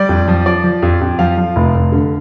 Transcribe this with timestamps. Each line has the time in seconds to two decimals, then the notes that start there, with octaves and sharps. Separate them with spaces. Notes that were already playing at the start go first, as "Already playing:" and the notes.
Already playing: G3 D5
0.09 F2
0.28 F3
0.46 F3 D5
0.64 F3
0.82 F2
1.01 F2
1.19 F3 F5
1.38 F3
1.56 F1
1.74 F1
1.92 D3